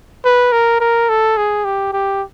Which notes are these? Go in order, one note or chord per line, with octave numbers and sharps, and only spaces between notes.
B4
A#4
A#4
A4
G#4
G4
G4